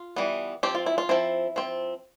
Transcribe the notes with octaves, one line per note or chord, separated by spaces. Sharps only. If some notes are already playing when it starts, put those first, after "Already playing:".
Already playing: F4
E3 G3 B3
F3 C4 G4
F4
E4
F4
F3 C4 E4
F3 C4